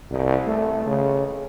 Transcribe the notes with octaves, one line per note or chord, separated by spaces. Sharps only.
C2
A3
C#3